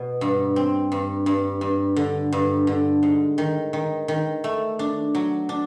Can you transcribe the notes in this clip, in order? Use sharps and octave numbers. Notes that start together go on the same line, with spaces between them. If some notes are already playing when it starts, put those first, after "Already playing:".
Already playing: B2 B3
G2
C4
G2
G2
G2
D3
G2
D3
G#2
D#3
D#3
D#3
A3
D4
F#3
D4